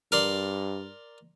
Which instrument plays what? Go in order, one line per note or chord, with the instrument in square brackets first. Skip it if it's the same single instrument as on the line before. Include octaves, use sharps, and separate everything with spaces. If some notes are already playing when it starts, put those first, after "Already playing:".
[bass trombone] G2 [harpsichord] A#4 D5 C6